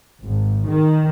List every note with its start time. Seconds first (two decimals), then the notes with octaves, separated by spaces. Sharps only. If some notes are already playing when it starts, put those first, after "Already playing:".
0.24 G#1
0.68 D#3